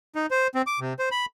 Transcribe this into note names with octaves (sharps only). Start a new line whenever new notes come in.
D#4
C5
C4
D6
C3
C5
B5